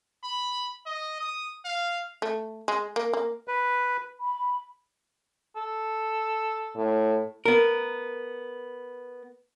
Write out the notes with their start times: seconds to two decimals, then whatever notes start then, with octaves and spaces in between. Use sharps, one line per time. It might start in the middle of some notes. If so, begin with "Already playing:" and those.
0.23 B5
0.86 D#5
1.20 D#6
1.65 F5
2.22 A3
2.68 G#3
2.96 A#3
3.13 A#3
3.48 B4
4.20 B5
5.56 A4
6.76 A2
7.45 B3 A#4